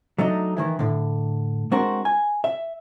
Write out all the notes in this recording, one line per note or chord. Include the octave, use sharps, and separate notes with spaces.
F#3 A3 D4 D#4
D#3 E3 E4
A2 D3
G#3 C4 D4 F#4 A#4 C5
G#5
E5